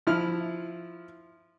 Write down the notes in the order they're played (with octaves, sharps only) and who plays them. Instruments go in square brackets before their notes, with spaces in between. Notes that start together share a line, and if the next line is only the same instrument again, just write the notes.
[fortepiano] F3 E4 F6